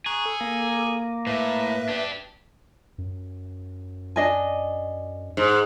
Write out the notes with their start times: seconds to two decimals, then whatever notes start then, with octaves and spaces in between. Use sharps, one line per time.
0.06 G#4 A#5 C#6 F#6
0.26 A4
0.41 A#3
1.27 A2 B4 E5
1.89 D4 G4
2.98 F#2
4.16 D4 D#5 G#5
5.37 G#2